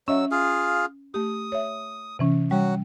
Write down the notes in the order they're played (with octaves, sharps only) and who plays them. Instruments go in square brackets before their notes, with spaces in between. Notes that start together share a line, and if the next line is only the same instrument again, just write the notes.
[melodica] F#3 E6 [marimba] C#4 D#5 E5
[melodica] F4 G#4 F5
[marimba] A3 G4 [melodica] D#6
[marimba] C#5 E5
C3 E3 C#4
[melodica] F#3 F#4 F#5 [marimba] G3